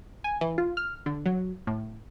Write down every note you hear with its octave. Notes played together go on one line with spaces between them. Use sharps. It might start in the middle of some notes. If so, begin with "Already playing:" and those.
G#5
E3
F4
F6
D3
F#3
A2